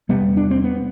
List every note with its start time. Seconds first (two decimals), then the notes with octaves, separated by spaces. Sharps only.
0.09 E1 E2 C3 G3 B3
0.37 D4
0.51 C4
0.64 B3